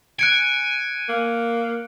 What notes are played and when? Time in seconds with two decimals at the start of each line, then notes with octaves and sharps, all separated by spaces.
0.19 G#5 F#6 C#7 D7
1.09 A#3